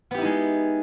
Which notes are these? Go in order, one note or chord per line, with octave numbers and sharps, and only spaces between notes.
G#3 B3 D#4 E4 G4